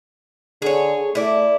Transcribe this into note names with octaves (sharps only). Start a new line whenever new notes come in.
D3 G#4 C#5
A3 E4 D5